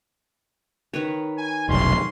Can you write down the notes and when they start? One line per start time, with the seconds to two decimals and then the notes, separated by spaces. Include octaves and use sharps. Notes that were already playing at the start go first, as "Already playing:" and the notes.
0.94 D#3 B4 C#5
1.38 G#5
1.69 F1 B1 G2 C#4 C6